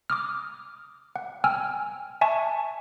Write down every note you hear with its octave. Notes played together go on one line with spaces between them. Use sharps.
D6 D#6 F6
F#5
G5 G#5 E6 F6
E5 G#5 A5 C#6